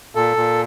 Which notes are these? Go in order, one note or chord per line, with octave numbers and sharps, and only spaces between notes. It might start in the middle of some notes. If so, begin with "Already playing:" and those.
A#2 A4
A#2